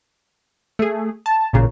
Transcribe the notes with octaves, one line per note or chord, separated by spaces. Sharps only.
A3 G#4
A5
A1 A#2 C#3